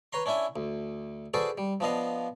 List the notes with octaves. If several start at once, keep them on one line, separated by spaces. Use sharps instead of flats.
B4 C#5 A#5 C6
C#4 D4 E4 E5 G#5
D2
F#4 G#4 A4 B4 C5 D5
G3
F3 B3 D4 D#5 F5